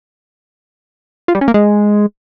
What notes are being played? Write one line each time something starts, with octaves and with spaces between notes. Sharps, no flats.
F4
G3
C#4
A#3
G#3